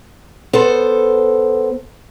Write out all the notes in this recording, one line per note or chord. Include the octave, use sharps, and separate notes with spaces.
B3 A4 C5